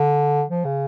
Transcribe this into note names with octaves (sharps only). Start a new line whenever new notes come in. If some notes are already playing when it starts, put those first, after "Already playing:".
Already playing: D3
F3
C#3